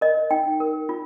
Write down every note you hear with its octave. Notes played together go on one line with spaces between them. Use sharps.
A#4 D#5
D#4 G5
A#4
F4